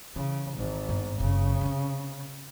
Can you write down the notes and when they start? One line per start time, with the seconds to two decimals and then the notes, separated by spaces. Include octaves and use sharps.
0.16 C#3 E3
0.57 G#1 G#2
0.89 G2 B3
1.20 F#1 C#3
1.61 C3 C#4